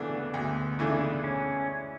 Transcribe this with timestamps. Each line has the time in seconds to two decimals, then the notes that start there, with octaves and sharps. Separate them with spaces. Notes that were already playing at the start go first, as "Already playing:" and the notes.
Already playing: D2 C#3 E3 A3 B3 D4
0.34 D2
0.79 C#3 E3 A3 D4
1.24 C#4